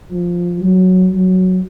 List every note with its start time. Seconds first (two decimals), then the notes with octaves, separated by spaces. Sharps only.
0.10 F3
0.61 F#3
1.12 F#3